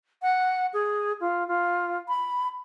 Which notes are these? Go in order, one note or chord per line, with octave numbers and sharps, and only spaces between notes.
F#5
G#4
F4
F4
B5